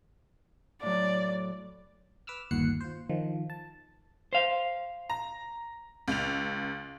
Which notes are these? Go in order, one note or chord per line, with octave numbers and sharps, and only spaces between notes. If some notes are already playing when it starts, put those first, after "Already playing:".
A2 F#3 D5
B4 D6 E6 F6
G1 D#2 A#2 F#5 C7 C#7
F4 C5
D#3 F3
A5
C5 F5
A#5
C#2 F7